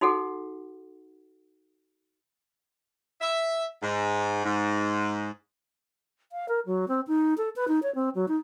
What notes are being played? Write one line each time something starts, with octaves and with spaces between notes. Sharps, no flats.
D#4 F#4 G#4 A4 F#5
E5
G#2
G#2
F5
A#4
F#3
C4
D#4
A4
B4
D#4
C#5
C4
F#3
D#4